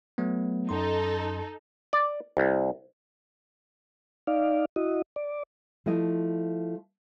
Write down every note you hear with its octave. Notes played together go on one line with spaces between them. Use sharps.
F#3 A3 B3
F#2 D#4 A4 C6
D5
C2
D#4 D5 F5
E4 F#4 D#5
D5
F3 A3 E4 D#5